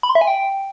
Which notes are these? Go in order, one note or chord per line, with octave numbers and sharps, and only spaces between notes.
B5
C6
E5
G#5
G5